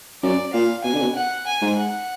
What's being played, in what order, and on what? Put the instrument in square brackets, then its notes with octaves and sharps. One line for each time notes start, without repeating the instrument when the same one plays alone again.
[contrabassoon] F#2 [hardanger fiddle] D5
[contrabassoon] A#2 [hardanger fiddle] F5
[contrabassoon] B2 [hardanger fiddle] G#5
[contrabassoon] D3
B2
[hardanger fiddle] F#5
G#5
[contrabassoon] G#2
[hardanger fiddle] F#5